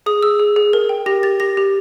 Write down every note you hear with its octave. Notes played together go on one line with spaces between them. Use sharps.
G#4 D#6
G#4 E6
G#4
G#4
A#4
G5
G4 A#6
G4 A6
G4 A#6
G4